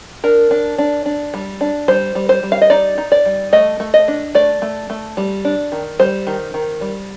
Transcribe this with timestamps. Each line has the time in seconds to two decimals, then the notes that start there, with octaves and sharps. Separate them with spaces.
0.24 D4 A#4
0.51 D4
0.78 D4
1.06 D4
1.34 G3
1.61 D4
1.88 G3 C5
2.15 G3
2.29 C5
2.43 G3
2.52 F5
2.62 D#5
2.70 D#4 D5
2.98 D#4
3.12 D5
3.26 G3
3.53 A3 D#5
3.80 A3
3.94 D#5
4.08 D4
4.35 A3 D5
4.62 A3
4.90 A3
5.17 G3
5.45 D4
5.72 D#3
5.99 G3 C5
6.27 D#3
6.54 D#3
6.81 G3